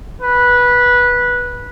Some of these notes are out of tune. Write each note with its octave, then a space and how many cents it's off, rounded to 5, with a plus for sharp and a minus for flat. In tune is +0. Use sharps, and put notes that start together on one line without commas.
B4 -15